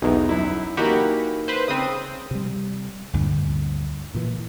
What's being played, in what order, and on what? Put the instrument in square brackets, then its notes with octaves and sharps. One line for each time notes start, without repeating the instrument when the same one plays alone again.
[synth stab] B1 E2 [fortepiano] D#4
[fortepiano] F#2 E4
[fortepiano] E3 A#3 D#4 [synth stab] F#4 G4 B5
[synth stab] B4 C5
[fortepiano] C#3 [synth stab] C4 D#6
[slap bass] C3 G3
D2 G2 A#2 D3
A#2 E3